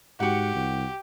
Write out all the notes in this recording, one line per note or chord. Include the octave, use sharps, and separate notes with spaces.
G#2 F#4 G4 F#5
C2